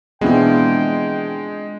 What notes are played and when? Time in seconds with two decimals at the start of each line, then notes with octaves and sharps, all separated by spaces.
0.21 B2 E3 G#3 C4 D4 F4 G5